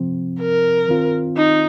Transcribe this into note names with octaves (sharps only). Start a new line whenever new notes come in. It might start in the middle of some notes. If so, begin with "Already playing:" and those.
Already playing: C3 F3 C4
A#4
D#3 C4 F4
D#4